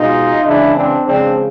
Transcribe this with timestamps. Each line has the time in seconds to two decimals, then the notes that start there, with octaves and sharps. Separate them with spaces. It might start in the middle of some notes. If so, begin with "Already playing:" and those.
Already playing: B2 G#3 D#4 F4
0.46 C#3 E3 G#3 D4 E4
0.75 C4 D4
1.05 C#3 F3 G#3 C4 D4